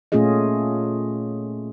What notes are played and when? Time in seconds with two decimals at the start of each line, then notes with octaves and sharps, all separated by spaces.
0.12 A#2 A3 C#4 F4 G#4 D#5